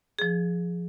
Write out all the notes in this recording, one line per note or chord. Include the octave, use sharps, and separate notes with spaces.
F3 G#4